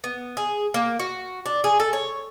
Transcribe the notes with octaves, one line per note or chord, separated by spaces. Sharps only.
B3
G#4
A#3
F#4
D4
G#4
A4
C#5